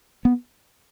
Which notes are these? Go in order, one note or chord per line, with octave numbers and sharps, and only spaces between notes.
B3